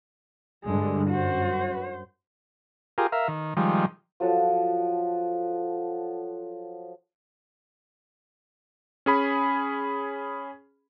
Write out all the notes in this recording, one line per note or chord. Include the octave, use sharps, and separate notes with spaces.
G2 D3 G#3
F#2 F#4 C5
F4 G4 G#4 A#4
A#4 E5 F5
D#3
D#3 F3 G3 G#3
F3 F#3 A4 F#5
C#4 G#4 B5